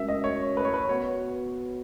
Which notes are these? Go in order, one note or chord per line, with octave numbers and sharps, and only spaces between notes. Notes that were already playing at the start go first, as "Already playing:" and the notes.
Already playing: G#3 C#4 F#4 A#4 E5
D#5
C#5
B4
C#5
B4
B3 F#4 B4 C#5 F#5